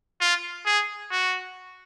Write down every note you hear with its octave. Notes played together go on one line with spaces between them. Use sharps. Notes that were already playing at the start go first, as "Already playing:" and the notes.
F4
G#4
F#4